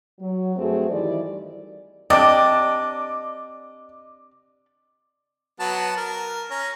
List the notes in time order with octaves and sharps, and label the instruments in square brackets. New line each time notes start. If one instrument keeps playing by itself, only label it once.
[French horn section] F#3
G2 A3 C4 F#4 G#4
D#3 E3 G3 E4 D5
[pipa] C3 D4 [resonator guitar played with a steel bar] D5 G5 [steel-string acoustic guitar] D#5 [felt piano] D6
[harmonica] F#3 B3 A5
A#4
C#4 A#5